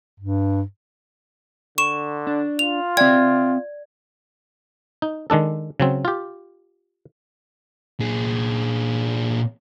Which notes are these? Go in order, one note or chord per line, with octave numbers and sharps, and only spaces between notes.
G2
D3 C#6 E7
D4
F4 F7
C4 D5 E5 G5 G#6
D#4
D#3 G#3 D4 A4
C#3 F#3 C4
F4 G4
A#2 G#4